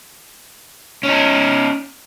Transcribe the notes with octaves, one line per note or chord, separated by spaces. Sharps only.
C#4 D#4